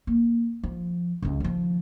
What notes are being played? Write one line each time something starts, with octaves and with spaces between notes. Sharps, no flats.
A#3
F3
C#2 G2
D#3 F3